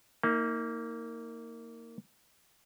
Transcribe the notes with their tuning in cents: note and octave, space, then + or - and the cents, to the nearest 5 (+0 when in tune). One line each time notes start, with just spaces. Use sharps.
A#3 -15 D#4 +35